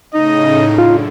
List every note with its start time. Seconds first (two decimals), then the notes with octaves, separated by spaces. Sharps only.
0.14 A2 C#3 D#4 D#5
0.78 F#2 D3 F4